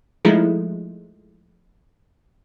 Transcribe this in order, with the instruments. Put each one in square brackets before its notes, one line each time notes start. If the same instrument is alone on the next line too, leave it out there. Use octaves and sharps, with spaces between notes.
[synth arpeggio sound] F3 G#3 A3 D#4 E4